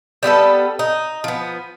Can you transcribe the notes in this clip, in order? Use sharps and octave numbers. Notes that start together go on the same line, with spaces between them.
G3 B3 E4 A4
D#4
F3 B3